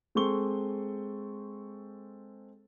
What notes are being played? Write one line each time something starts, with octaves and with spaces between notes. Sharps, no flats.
G#3 C4 A4 C6 C#6 G7